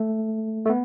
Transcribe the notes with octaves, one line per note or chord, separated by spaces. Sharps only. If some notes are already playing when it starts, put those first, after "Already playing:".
Already playing: A3
A3
B3